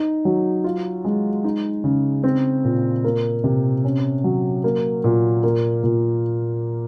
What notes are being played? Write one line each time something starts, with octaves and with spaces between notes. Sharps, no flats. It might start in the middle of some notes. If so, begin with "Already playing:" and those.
Already playing: D#4
F#3
F4
G#3
D#4
C#3
C4
A#2
A#3
C3
C#4
F#3
A#3
A#2
A#3
A#2